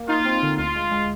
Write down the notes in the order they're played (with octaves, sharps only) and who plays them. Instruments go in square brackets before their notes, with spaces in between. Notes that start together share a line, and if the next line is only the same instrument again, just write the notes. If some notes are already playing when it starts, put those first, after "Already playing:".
Already playing: [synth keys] A#3
[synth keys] D#4 [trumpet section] F4
[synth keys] C4
D3
[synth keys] D2 [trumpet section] F4
[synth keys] G#3
G#3